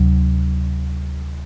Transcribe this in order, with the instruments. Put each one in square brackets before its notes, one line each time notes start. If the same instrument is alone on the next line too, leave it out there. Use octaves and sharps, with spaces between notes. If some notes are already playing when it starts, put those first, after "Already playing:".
Already playing: [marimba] D2 C3 F#3